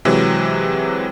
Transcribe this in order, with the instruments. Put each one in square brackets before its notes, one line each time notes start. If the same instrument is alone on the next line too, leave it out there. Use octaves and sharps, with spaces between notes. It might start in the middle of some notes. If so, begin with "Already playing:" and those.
[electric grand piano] C3 E3 F#3 G#3